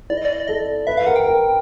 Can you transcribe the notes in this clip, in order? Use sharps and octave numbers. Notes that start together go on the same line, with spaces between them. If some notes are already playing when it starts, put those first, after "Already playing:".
E4 D5
D#5
D5
D#5
D5
A4 D#5
D5
B4 E5
F5
A#4 F#5
G5
A#4